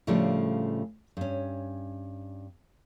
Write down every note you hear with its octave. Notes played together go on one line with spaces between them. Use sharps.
A2 C#3 F3 G3 A3 D4
G2 C#4